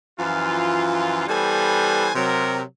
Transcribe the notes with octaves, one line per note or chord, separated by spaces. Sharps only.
F#2 E3 F3 F4
E3 G3 B3 A4 C5 G#5
C3 F#3 A#4